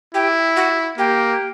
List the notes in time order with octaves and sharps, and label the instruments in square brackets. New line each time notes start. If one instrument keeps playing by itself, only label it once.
[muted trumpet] E4 [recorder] G4
[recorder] F#4
[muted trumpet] A#3 [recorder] G4